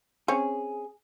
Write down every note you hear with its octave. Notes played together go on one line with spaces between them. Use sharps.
C4 C#4 G#4 C#5